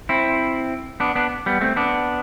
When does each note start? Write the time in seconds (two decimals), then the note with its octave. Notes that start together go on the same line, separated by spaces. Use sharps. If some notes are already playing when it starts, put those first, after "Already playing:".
0.09 C4 E4
1.00 B3 D4
1.16 B3 D4
1.46 G3 B3
1.61 A3 C4
1.76 B3 D4